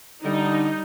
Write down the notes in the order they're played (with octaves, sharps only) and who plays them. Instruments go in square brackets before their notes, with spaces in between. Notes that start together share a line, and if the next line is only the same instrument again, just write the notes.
[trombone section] D3 [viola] G3 [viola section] D#4